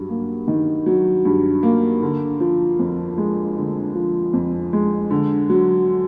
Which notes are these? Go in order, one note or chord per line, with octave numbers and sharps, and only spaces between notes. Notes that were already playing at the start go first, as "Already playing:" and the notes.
Already playing: G2 F#3
A#3
D#3
F#3
G2
A#3
D3
F3
F2
G#3
D3
F3
F2
G#3
D3
F#3